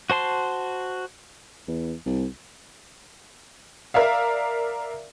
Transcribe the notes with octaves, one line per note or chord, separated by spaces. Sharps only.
F#4 C5 A5 C6
E2
C2
A#4 D5 E5 F5